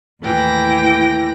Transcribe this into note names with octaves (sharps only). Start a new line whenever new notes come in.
D#2 A2 E3 G5 A#6